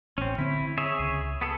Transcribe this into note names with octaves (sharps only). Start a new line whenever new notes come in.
A1 C4 C#4
D3 C4 E4
G#4 C#5 E5
C#2
B3 G#4 A4